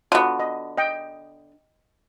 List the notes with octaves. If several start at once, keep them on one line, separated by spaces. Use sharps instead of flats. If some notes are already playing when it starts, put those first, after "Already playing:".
D3 B3 F4 F#4
D#5
D#5 G5